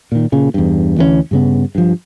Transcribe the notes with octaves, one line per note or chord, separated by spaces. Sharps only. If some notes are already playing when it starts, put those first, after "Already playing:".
A#2 D#3
A#2 C#3
E2 G2
D2 E3 G3 C#4
G2 C#3 B3
G2 F3